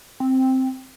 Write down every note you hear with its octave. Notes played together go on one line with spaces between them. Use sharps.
C4